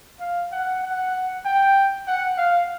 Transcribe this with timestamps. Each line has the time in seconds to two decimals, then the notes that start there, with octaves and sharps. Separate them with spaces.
0.20 F5
0.52 F#5
0.83 F#5
1.45 G5
2.08 F#5
2.38 F5